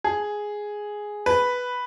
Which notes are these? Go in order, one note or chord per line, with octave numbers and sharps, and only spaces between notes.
G#4
B4